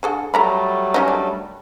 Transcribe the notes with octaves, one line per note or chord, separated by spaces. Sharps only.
D3 G#4 A4
F#3 G3 A3 A4 A#5 B5
D#3 C#4 D#4
D4